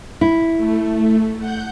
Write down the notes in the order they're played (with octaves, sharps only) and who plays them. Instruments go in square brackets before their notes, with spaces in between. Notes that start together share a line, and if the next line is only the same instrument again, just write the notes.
[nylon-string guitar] E4
[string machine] A3
F#5 G6